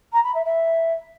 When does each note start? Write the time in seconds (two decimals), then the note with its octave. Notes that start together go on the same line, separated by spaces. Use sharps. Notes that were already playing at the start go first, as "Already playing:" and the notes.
0.13 A#5
0.24 B5
0.34 E5
0.45 E5